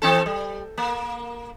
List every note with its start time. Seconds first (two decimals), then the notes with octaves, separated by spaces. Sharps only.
0.02 E3 C4 A4
0.26 G3
0.78 A#3